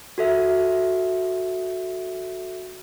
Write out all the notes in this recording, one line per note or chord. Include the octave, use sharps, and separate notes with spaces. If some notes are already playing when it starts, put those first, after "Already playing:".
F#4 A4 E5